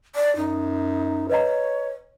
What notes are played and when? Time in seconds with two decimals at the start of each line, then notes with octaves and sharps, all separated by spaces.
0.16 D5
0.36 F#2 D#4
1.29 B4 C#5 D#5 A#5